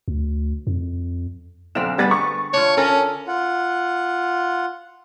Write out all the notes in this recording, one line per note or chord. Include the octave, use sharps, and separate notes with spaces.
D2
F2
B1 D3 C4 E7
G3 B3 G#4 B4 F#5 A6
C#6
D4 F4 C#5
C#4 A4 A#4
F4 F#5